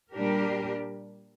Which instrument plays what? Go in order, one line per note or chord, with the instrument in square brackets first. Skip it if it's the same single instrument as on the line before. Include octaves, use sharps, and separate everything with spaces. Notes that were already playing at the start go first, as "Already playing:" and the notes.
[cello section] A#2 G3 D4 G4 A#4